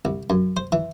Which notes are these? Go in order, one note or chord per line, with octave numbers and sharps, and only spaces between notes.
C2
F#2
C5
E3